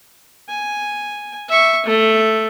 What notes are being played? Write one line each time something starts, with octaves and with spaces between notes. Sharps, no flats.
G#5
E5 C#6
A3